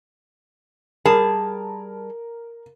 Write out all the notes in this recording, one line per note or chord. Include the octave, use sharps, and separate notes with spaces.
G3 G#4 A#4 A5